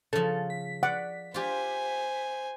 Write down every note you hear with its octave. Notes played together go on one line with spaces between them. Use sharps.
C#3 F3 A4
B6
D5 F#5
F4 G4 C5 G#5